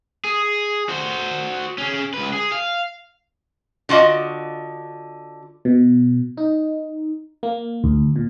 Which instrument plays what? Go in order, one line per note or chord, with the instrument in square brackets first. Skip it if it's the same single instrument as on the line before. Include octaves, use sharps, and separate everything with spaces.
[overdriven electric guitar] G#4
F#4 C5
C#4 G#4
C#2 B4
G#4
F5
[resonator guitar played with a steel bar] D3 F4 F#4 D#5
[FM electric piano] B2
D#4
A#3
D2
A#2